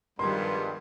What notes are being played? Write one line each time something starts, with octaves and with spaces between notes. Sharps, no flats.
G2 D#3 F3 G3 G#3 B3 C6